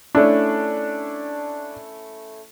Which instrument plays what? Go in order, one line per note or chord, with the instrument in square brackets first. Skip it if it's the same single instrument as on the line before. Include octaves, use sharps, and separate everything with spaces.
[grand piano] A3 C#4 E4 [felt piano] D4